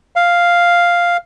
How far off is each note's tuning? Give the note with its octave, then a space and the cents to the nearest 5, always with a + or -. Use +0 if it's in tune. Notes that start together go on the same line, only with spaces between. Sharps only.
F5 +0